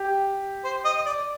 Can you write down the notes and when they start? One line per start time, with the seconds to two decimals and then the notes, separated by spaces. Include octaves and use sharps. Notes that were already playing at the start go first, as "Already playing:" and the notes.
Already playing: G4
0.64 C5
0.85 D#5
1.06 D5